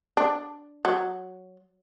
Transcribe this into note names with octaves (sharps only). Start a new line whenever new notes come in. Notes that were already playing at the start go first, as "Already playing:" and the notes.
D4
F#3